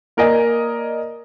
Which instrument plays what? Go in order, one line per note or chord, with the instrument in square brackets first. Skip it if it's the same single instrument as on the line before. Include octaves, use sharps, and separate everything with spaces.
[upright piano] A#3 A#4 D5 D#5 G#5